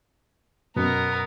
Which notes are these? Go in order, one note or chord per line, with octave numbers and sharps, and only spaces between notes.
F#2 B2 B3 A#4